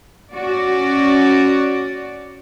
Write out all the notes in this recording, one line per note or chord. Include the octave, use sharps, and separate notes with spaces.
C#4 F#4 D5